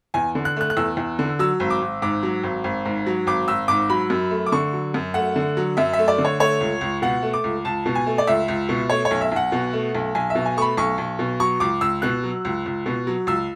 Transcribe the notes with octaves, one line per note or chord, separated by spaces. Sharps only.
E2 G#5
D3
F#6
A3 F#6
F#6
E2 E6
E2
D3
F#3 E6
G#1
D6
G#1
G#2 D6
F#3
G#1
G#1
G#2
F#3
G#1 D6
G#1 E6
G#2 D6
F#3 B5
F#2
A3
D6
D3 C#6
F#3
F#2
A3 F#5
D3
F#3
F#2 E5
E5
A3
D5
D3
C#5
A3 C#5
C#2
C#2
B2 F#5
A3
D6
C#2
C#2 A5
B2
G#5
A3
D5
C#2 E5
C#2
B2
A3 C#5
C#5
B1
E5
B1 F#5
B2
A3
B1
B1 G#5
E5
B2
G#5
A3 B5 C#6
B1 C#6
B1
B2
F#3 C#6
C#2 D6
C#2 E6
B2 F#6
F#3
C#2
C#2
B2
F#3
C#2 E6